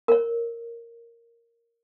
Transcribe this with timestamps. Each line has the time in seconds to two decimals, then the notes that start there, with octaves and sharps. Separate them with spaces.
0.08 A#4 C#5